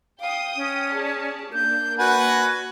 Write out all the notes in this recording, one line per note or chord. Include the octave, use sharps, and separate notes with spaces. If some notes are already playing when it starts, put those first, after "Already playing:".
F5 G5 D#6
C#4
G#4 D5 A5
A#3 D4 G6
F#4 B4 F#5 G#5